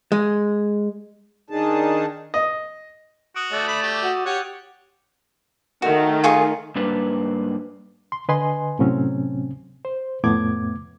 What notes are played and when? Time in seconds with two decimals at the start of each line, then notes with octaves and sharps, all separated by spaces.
0.12 G#3
1.50 D#3 D4 D#4 G#4 A5
2.34 D#5
3.36 F#4 D#6 D7
3.53 A3 D5 E6 A6
3.68 B5 C#6 D6 F#7
3.83 G4 C#6 D6 G6
4.03 F#4 E7
4.26 G4 C#5 F#5 C#6 C#7 F7
5.82 D#3 A3 F#4
6.24 F4 G#4 C#6
6.75 G#2 G3 A#3 D4 B4
8.12 C6
8.29 D3 B4 D#5 G#5 C6
8.79 A2 C3 F#3 C4 C#4
9.85 C5
10.24 F2 A2 A3 B3 D6 G#6